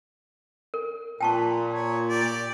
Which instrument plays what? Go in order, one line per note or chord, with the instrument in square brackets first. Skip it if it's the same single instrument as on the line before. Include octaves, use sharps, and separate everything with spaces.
[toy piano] A#4
[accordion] A#2 [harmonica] B4 [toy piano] G5 A5 C#6
[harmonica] C#5
G4 D5